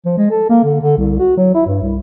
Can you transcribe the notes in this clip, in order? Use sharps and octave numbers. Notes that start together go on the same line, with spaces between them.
F3
G#3
A4
A#3
D3
D3
C2
F#4
F#3
E4
G2
C2